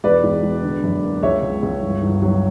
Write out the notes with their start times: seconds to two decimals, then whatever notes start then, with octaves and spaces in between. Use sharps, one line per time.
0.04 E1 B4 D5
0.24 E1
0.43 E1
0.63 D3
0.84 F#2
1.03 A#3
1.23 C#2 C#5 E5
1.42 C#2
1.63 C#2
1.83 G1
2.02 G1
2.22 F#3